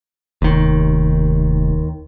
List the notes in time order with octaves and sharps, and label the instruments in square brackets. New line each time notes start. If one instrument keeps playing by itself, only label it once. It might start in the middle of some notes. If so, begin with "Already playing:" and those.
[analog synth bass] F1 [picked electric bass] D#2 D#3